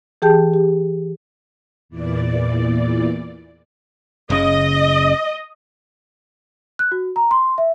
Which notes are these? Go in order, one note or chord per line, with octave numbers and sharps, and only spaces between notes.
E3 G4 G#4 G5 A5 G6
G4
E2 A#2 E3 D5
F#1 C#3 D#5
F#6
F#4
A#5
C6
E5